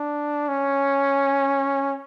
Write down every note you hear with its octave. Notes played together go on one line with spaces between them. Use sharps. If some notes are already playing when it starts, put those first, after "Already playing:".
Already playing: D4
C#4